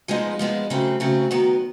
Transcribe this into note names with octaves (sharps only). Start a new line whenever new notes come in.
F3 G#3 B3 D#4
F3 G#3 B3 D#4
C#3 F#3 A3 C4
C#3 F#3 A3 C4
D#3 F#3 B3